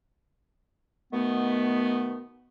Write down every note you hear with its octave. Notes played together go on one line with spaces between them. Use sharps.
B2 D#3 A3 B3